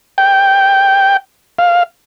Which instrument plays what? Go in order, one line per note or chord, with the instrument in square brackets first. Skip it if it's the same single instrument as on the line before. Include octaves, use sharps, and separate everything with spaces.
[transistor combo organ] G5
F5